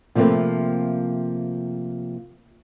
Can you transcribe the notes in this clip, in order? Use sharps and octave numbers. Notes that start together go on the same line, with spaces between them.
C3 F3 A3 A#3 C4 B4